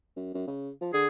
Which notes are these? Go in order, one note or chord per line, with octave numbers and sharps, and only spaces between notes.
F#2
F#2
C#3
F3
D3 G#4